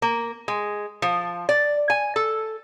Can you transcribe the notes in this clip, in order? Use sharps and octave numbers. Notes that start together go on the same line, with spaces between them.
A#3
G#3
F3
D5
G#5
A4